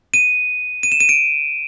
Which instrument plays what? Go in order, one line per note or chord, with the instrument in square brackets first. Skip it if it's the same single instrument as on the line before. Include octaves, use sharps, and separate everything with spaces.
[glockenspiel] D#7
D#7
E7
D#7
D7